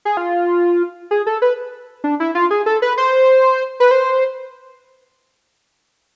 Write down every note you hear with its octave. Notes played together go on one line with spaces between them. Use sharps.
G#4
F4
G#4
A4
B4
D4
E4
F4
G#4
A4
B4
C5
B4
C5